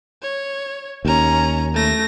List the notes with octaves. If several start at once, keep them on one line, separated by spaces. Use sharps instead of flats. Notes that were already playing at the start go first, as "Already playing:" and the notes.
C#5
D#2 C#4 A#5
A3 A#6